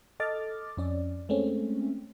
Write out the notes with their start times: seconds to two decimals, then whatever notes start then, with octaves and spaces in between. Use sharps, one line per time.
0.20 A4 D#5 D6 F6 A6
0.77 F2 C#4 D5
1.29 G#3 A3 C4 C#4